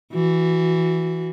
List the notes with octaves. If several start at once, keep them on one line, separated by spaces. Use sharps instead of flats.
E3 F#4